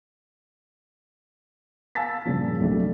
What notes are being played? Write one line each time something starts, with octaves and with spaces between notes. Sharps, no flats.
F5 G#5 A5 E6 A6 B6
G2 A#2 C#3 F3
B1 C3 A3 D4